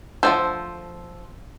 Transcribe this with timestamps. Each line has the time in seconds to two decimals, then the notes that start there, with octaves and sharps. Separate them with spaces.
0.23 D3 F3 A3 C4 C5 E6 G6